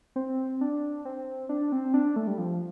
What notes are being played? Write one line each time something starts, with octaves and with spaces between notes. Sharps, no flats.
C4
D4
C4
D4
C4
D4
A3
G3
F3